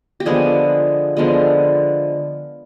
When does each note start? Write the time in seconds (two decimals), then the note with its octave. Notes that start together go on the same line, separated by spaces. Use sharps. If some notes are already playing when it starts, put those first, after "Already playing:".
0.20 G4
0.26 D3 F3 G#3 B3 G#4
1.17 D3 F3 G#3 B3